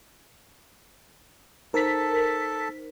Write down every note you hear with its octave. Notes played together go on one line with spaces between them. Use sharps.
D#4 A4 A#4 C5 A5 B6